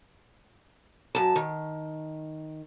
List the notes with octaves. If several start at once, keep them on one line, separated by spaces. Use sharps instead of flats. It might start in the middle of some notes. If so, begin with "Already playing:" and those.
F#2 A5
D#3